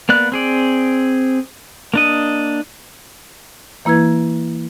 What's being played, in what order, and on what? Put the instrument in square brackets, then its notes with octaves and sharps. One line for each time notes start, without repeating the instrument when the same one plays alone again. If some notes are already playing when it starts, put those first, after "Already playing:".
[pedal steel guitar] A#3 B3 D5 F#6
C4 G#4 D5
A#3 D4 D#5
[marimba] E3 A#3 E4 B4 G#6